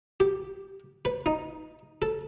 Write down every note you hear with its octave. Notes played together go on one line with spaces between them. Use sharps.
G4
B4
D#4
A4